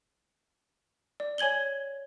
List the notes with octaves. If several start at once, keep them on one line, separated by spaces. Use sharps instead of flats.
D5
C#5 G#5 G#6 F#7 G7